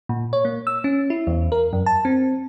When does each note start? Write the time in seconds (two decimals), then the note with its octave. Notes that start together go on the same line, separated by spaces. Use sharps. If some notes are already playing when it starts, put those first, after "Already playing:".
0.09 A#2
0.33 C#5
0.45 A#3
0.67 E6
0.84 C#4
1.10 E4
1.27 E2
1.52 A#4
1.73 F#2
1.86 A5
2.05 C4